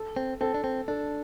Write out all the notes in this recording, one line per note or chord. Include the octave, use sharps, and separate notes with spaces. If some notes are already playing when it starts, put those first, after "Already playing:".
Already playing: A4
C4
C4 A4
D4
C4
D4 A4